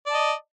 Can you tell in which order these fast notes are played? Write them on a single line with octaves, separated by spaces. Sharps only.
D5 A5 D#5